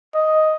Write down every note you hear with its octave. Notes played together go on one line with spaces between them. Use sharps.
D#5